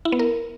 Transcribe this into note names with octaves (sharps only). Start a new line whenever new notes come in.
E4
B3
A#4